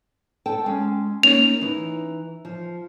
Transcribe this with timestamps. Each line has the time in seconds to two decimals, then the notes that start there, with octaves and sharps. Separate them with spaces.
0.46 A4 G5 A5
0.66 G#3 C#4
1.23 A#3 C#4 D#4 F7
1.61 E3 D#4
2.45 F3